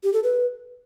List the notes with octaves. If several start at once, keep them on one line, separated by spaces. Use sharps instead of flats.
G4
A4
B4